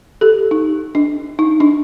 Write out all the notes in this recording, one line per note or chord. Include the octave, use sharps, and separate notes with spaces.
G4 A4
D#4
D4
D#4
D4